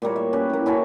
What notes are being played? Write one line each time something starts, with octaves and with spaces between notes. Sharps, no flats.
A#2 G3 A#3 C#5
E5
C#4 G4 B4
A#3 E4
C#4 E4 F#4 A4